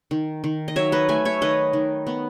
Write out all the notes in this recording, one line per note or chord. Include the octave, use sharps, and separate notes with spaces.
D#3
D#3
D#5
F#3 C#5 E5
B4 D#5
A3 E5 G#5
C#5 E5
D#3 B4 D#5
D#3
B3